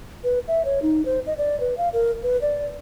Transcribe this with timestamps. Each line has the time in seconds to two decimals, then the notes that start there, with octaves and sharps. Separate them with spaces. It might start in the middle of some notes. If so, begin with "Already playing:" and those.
0.24 B4
0.48 E5
0.65 C#5
0.82 D#4
1.05 C5
1.27 D#5
1.38 D5
1.60 B4
1.78 F5
1.93 A#4
2.23 B4
2.41 D5